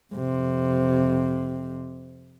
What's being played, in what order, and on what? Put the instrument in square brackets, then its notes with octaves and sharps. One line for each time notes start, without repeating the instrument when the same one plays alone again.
[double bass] F2 C3